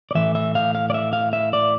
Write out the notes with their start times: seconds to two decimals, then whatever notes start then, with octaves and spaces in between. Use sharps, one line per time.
0.11 D5
0.15 A2 E3 E5
0.35 E5
0.55 F5
0.75 F5
0.90 D5
0.94 E5
1.13 F5
1.33 E5
1.53 D5